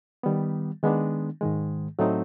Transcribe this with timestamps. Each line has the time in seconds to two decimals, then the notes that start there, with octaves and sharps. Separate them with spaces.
0.23 D#3 G3 B3
0.83 D#3 G#3 B3 D4
1.41 G#2 D#3 G#3
1.99 A2 F#3 A3 C4 D#4